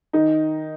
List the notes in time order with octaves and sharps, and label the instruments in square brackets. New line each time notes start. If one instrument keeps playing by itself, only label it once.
[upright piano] D#3 D#4